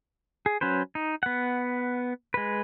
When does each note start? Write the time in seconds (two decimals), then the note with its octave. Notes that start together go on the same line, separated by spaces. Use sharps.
0.46 G#4
0.61 F#3 C#4 B4 C5
0.95 D#4
1.23 B3 F#5
2.34 G#3 B4